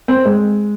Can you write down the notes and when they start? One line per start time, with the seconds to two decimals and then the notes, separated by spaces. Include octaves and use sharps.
0.08 C4
0.25 G#3